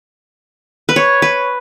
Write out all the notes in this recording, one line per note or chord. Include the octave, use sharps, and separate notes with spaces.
B4
C#5
B4